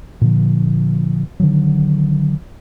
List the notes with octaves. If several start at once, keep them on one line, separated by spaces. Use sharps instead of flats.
A#2 D3 F3
D3 D#3 F#3